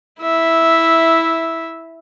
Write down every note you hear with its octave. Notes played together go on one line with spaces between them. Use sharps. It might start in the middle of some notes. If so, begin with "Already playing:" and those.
E4 E5